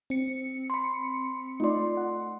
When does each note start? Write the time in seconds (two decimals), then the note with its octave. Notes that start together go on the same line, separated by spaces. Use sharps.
0.10 C4 C#7
0.70 B5 C6
1.60 A3 D#4 F4 D5 C6
1.97 F#5